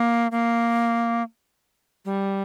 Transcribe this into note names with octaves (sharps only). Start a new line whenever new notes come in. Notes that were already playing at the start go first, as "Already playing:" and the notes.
Already playing: A#3
A#3
G3